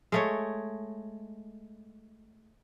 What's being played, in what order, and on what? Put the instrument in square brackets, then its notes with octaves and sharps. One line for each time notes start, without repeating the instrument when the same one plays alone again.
[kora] G#3 A3 C#5